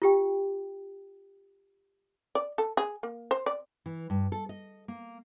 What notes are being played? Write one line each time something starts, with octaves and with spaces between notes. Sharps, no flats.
F4 G4 G5
D5
A4
G#4
A#3
C5
D5
E3
G2
A4
D#5
A#3